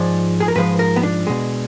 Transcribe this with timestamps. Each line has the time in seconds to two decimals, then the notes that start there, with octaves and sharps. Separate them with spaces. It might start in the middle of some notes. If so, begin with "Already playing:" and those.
Already playing: G#2 F3 G#3 D5
0.40 G#4
0.48 A#4
0.55 G#2 F3 G#3 B4
0.79 A#4
0.96 B3
1.03 D4
1.27 B2 G#3